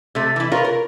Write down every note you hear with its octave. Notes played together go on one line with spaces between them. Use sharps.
C3 A3
E3 E4
F4 A#4 B4 C#5
A#4